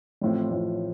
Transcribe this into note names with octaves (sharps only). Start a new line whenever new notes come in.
A1 A2 F3 C4
A1 A2 F3 C4